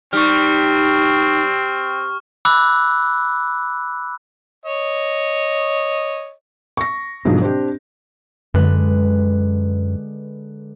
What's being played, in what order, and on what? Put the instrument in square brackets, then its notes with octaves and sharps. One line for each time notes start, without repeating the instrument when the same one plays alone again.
[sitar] G3 [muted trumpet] C4 [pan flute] D#4 [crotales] C#6 F6
[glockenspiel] B5 D6 E6 F#6
[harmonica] C#5 D#5
[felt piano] C#6 A#6
G#2 B2 D3 F3 F#3
C4 D4 G4
[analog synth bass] F#2 [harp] D3 G#3 B4